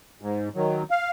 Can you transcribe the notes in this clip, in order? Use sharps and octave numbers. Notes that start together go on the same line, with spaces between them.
G#2
D#3 F#3
F5